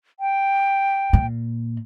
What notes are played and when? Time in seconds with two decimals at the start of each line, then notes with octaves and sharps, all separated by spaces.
0.20 G5
1.13 A#2